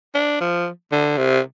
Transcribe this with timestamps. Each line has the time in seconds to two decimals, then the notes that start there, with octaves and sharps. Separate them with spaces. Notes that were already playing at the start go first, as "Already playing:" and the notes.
0.15 D4
0.41 F3
0.92 D3
1.18 C3